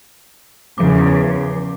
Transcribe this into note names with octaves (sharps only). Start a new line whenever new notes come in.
E2 C#3 F3 D6